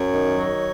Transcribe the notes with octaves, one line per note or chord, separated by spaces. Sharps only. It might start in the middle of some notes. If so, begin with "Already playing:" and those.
Already playing: F#2 C#5
D#3
F#3